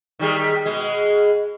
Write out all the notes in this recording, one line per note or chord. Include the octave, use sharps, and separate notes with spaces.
D#3 G3 G#4
B2 G#3